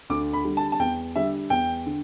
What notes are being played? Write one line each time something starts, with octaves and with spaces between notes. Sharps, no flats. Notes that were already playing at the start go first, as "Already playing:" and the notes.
D2 D6
B5
D3 G3
A5
A5
E2 G5
D3 G3 E5
E2 G5
D3